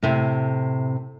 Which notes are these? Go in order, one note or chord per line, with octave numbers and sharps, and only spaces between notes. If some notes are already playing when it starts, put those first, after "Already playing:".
A2 C3 E4